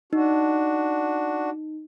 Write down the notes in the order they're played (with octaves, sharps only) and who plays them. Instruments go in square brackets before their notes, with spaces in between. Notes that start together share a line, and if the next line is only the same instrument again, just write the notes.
[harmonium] D4 F#4 [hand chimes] D#4